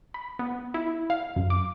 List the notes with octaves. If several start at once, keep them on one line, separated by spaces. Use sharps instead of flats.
B5
B3
E4
F5
F#2
D6